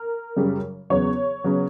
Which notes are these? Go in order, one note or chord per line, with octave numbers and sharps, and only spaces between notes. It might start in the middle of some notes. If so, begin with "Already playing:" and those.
Already playing: A#4
F#2 C#3 G3
E2 C#3 F#3 B3 C#5
C#3 F#3 B3